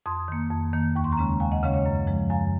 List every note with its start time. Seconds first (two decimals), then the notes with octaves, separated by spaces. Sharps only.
0.06 F2 C6 D#6
0.28 D#3 A#3
0.51 F2
0.73 D#3 A#3
0.96 D#2 C#6
1.04 C6
1.11 A#5 C#6
1.17 C#3 G#3 C#4
1.40 D#2 F5 G#5
1.52 D#5 F#5
1.63 C#3 G#3 C#4 C#5 F5
1.74 C#5 F5
1.86 F#2
2.07 F3 G#3
2.30 F#2 F5 G#5